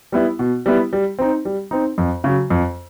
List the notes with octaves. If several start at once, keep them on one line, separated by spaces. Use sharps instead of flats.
G3 B3 E4
B2
G3 B3 E4
G3
C4 D#4
G3
C4 D#4
F2
C#3 F#3
F2